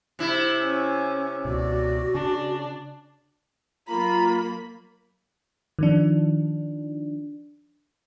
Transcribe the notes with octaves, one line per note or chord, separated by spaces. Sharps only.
C3 E4
C#4
C#2 B2 F#4 D5
C#3 D4
F#3 A#3 F4 A#5 B5
D#3 F3 D4